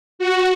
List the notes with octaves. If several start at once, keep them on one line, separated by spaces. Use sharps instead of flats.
F#4